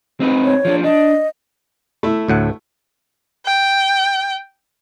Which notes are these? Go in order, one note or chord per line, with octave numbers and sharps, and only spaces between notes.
C4 D#4 B4
C#5
F3 D4
D4 D#5
A3 E4
D2 A2 F#5
G5